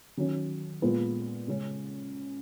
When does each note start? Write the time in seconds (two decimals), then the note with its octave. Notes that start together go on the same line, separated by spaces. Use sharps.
0.17 D#3 F#3 C#4
0.82 A#2 G#3 B3 F4 B4
1.47 C#3 G#3 C#4